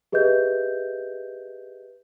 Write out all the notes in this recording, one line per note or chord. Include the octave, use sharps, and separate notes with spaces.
G4 G#4 B4 D#5 E5 G6